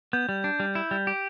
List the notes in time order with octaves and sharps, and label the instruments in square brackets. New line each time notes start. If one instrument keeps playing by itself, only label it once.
[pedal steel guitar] B3 [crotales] G6
[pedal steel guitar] G3
D4
G3
E4
G3
G4